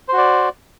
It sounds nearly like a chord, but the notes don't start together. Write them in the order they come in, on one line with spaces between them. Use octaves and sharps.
C5 F#4 D5